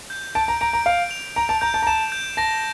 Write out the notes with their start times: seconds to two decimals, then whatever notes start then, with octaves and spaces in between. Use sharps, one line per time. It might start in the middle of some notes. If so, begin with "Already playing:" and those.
0.10 G6
0.35 A5 D7
0.48 A#5
0.61 A#5 D7
0.73 A#5
0.86 F5 D7
1.11 F7
1.36 A#5 D7
1.49 A5
1.61 A#5 G6
1.74 A5
1.82 A#5
1.87 A5 E7
2.12 G6
2.37 A5 A#6